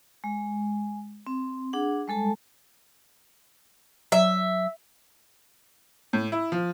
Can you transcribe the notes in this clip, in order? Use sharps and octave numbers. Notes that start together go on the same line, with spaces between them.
G#3
C4
D4 G#4 F#5
G3 G#3 A4 A5
F#3 E5
A2
E4
F3